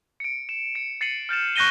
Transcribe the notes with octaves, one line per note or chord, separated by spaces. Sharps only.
C#7 D7
E7
C#7
A6 C7 C#7 D#7 F#7
F6 G6 A6 E7
C#6 F#6 G6 A#6 D#7 G7